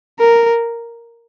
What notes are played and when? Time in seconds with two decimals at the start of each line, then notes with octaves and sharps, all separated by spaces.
0.20 A#4